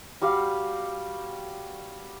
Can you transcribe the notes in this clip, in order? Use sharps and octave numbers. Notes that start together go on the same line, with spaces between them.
G3 F#4 G4 F5